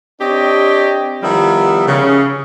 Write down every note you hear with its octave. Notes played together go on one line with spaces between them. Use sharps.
C4 D4 G4 C#5 D#5
D#3 F3 G3 B3 E4
C#3